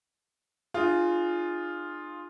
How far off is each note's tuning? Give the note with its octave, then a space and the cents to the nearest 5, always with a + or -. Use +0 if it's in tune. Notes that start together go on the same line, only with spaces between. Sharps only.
D4 +45 F4 +0 G#4 +0